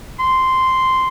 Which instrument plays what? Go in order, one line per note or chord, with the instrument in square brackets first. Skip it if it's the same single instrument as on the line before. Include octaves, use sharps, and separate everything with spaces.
[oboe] C6